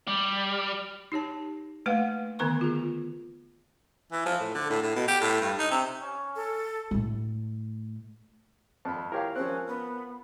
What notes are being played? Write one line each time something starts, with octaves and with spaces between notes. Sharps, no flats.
G3
D#4 G4 C#5 A5
A3 A#3 B4 F5 F#5
D3 D#3 B3 A#4 A#5 C#6
F4 G#4
E3
F3
A2
D3
A2
A2
B2
G4
A2
G2
D#4
C3
C#4
A4
A2 A3
F2 A5 B5
E4 G4 A#4 C#5 F5
F3 C4 C#4 A#4 F#6
B3